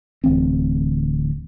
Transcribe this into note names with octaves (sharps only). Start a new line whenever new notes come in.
D1 D2 E3 C4